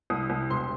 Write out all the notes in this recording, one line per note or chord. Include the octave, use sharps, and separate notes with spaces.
C2 D#6
C2
E1 C6